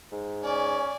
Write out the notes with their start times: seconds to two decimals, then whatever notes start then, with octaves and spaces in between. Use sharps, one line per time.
0.12 G#2
0.44 C#4 D5 G#5